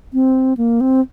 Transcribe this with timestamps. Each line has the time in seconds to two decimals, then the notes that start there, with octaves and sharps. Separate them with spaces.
0.13 C4
0.57 A#3
0.81 C4